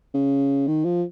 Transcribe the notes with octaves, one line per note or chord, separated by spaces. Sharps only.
C#3
D#3
F3